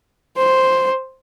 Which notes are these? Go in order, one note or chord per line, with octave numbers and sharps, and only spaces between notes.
C5